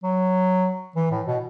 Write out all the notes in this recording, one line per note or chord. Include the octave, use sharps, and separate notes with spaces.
F#3
E3
A2
B2